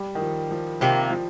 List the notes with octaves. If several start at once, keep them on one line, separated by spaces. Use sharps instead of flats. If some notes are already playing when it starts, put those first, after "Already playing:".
Already playing: G3
D#3
F3
F3
C3 D#3 F3 A#3
F3